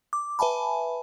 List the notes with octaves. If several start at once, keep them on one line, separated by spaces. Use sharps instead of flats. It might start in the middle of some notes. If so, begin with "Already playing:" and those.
D6
B4 E5 G#5 A5 B5